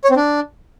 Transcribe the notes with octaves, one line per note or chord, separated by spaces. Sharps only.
C#5
C4
D4